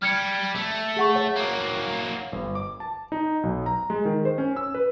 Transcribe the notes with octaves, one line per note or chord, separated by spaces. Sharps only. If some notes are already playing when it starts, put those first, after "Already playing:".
G3 F6 G#6 C#7
A3
G#4 F#5 C#6
C#5 F#5
F#3 A#3
G1
D6
A5
D#4
B1
A#5
G#3
D#3
C5
C#4
E6
B4